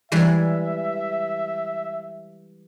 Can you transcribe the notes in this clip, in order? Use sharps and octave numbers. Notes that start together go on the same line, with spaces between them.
E3 G3 G#3 E5